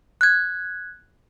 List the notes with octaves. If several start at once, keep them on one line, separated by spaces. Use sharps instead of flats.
F#6 G#6